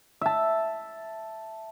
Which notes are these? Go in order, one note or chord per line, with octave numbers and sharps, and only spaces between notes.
E5 A5